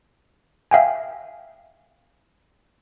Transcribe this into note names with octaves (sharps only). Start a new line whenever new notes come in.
E5 F5 G5 G#5